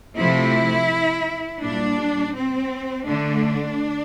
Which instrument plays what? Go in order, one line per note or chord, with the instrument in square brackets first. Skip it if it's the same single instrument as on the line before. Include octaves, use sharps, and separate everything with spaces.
[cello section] C3 F3 A3 E4
A#2 G3 D4
C4
D3 A3 D4